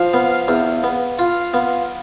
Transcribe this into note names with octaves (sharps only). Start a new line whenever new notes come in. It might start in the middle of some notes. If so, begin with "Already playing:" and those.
Already playing: F3 F5
B3
E2
B3
F4 F5
B3 F5